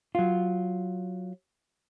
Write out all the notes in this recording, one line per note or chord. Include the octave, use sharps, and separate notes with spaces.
F#3 F4